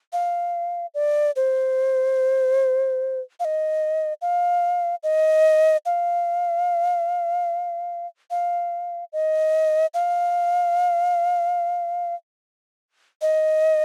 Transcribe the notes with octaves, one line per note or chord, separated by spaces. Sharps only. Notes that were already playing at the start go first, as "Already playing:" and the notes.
F5
D5
C5
F5
D#5
F5
D#5
F5
F5
D#5
F5
D#5